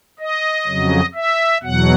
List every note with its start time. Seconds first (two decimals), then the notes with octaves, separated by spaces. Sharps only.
0.19 D#5
0.67 F2 C#3 F#3
1.15 E5
1.63 E2 B2 F#3 F#5